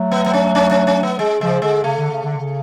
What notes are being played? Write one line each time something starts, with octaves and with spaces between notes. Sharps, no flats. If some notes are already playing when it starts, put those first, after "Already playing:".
Already playing: F#3 A3
B3
B3
C#4
C#4
C#4
C#4
B3
G#3
C#3 F3 G#3
D3 G#3
C#3 A3
D3
C#3
D3
C#3